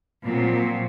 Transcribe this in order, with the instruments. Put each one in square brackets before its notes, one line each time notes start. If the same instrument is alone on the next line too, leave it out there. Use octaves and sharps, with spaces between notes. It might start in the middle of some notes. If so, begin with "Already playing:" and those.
[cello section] A#2 F3 F#3 C4